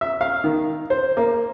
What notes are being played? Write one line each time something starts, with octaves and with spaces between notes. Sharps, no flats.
E5
F5
D#3
C5
A#3